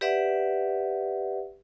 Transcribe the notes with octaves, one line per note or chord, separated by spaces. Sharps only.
G4 B4 D5 E5 F#5